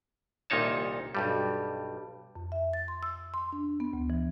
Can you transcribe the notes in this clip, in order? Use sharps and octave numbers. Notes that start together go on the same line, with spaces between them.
C2 A#2 D#3 D#4 C#5 A5
B1 G2 G3
F2
E5
A6
C6
E6
C6
D4
B3
D2
E3